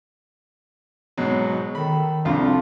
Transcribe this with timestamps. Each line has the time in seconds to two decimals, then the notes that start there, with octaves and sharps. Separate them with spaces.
1.17 G#2 B2 F#3
1.75 D#3 A4 B5
2.25 C2 F2 D4 F4